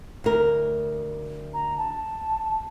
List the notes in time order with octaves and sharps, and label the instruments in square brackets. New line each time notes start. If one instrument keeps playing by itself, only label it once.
[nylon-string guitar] D2 A#4
[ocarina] A#5
A5